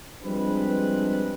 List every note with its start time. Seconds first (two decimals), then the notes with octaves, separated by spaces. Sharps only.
0.23 F3 G3 G#3 C4 D4 B4